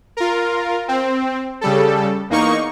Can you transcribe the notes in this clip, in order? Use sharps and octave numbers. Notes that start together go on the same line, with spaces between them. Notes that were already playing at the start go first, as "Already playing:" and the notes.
F4 A#4
C4
C#3 G3 A4
E2 A#3 D#4 C#6